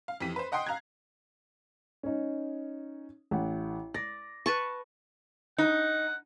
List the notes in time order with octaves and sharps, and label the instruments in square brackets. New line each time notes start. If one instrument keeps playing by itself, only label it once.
[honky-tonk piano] F5
F2 E3 G4 B6 D#7
B4 C5
D#5 F#5 G5 C6 D#6 C7
F5 A#5 F#6 G#6
[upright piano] C#4 D#4
A1 F#5
[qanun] D5 [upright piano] A#6
[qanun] B4 A5 C#6
[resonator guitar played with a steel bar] D#4 [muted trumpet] F#5